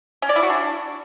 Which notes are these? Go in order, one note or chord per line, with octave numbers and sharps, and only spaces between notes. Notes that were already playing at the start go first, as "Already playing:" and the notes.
C#4
D5
E4
F#4
D4